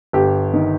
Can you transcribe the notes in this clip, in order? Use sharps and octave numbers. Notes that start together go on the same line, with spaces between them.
G1 G4
D#3